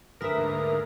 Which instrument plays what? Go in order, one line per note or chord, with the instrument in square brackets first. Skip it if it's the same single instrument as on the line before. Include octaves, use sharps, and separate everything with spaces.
[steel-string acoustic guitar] D2 B4 [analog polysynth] A#4 E5 [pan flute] D#6
[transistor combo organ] G#2 D3 A#3